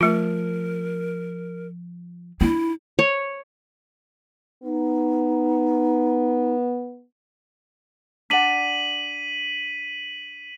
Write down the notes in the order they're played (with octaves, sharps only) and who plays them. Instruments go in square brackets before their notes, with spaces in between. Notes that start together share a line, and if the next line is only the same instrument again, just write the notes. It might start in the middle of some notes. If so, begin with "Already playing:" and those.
[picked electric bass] F3 [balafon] A3 F4 [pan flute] A#4
[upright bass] D4 [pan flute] E4
[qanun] C#5
[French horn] B3 [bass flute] D#4
[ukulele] D4 D5 F#5 [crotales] B6 D#7 F#7